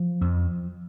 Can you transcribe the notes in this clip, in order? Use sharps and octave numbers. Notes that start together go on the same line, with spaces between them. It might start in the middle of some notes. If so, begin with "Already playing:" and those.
Already playing: F3
F2